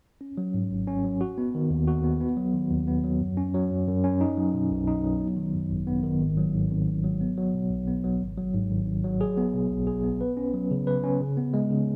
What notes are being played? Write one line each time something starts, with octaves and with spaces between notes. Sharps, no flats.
C#4
F#3
G#2
G#1
C#4
F#3
F#4
B3
D#3
D#2
F#4
B3
B3
F#3
D#3
D#2
B3
F#3
F#2
C#4
F#3
F#2
F#2
C#4
D#4
F#3
B2
B1
D#4
F#3
B3
D#3
F#2
G#1
B3
D#3
G#1
F#3
G#2
G#1
G#1
F#3
B3
F#3
B2
B1
B3
F#3
G#1
F#3
G#2
G#1
G#1
F#3
G#4
B3
B2
B1
G#4
B3
B4
C#4
F#3
C#3
B4
C#4
C#3
B3
G#3
C#3